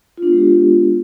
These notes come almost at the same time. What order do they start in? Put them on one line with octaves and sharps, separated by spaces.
F4 D4 B3 G#3 G4